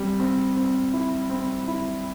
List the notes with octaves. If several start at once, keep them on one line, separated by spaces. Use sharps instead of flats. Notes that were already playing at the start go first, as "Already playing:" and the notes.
Already playing: G3 C4
C4
C4
E4
C4
E4